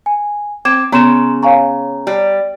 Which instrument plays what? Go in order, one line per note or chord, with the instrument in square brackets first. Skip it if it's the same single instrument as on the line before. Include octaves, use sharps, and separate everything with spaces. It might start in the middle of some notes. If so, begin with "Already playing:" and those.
[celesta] G#5
[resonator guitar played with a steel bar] C4 [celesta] D6 G#6 E7
[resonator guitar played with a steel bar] C#3 [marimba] B3 [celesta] A#5 C6 E7
[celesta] C#5 A#5 [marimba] F5 G#5 C#6
[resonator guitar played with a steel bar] G3